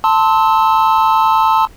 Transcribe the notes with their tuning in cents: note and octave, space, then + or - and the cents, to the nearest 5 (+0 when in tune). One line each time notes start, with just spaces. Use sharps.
A5 +10 C6 +0 E6 -30